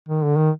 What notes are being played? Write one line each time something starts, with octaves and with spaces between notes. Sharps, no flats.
D#3
D3
D#3